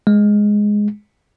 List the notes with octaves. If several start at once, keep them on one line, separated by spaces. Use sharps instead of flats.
G#3